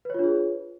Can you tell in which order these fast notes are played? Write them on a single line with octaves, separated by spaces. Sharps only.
B4 C#5 F4 D4 G#4